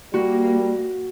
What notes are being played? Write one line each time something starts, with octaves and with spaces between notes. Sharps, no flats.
G3 A#3 F#4